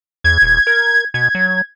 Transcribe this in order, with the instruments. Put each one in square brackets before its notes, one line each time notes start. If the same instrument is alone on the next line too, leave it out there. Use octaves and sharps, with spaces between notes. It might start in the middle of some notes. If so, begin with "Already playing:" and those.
[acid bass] E2 [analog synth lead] G#6
[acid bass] D#1
A#4
[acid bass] B2 [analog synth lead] G#6
[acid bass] F#3